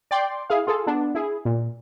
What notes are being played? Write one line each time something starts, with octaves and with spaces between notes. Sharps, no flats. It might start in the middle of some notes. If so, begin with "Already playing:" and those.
D5 G5 C6
E4 G#4 F5
F4 G#4 A4
B3 D4
E4 G#4
A#2